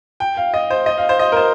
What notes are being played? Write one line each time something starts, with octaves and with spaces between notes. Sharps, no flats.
G5
F5
D#5
C5
D#5
F5
C5
D#5
A#4
C5